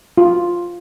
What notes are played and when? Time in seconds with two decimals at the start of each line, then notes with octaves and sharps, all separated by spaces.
0.18 F4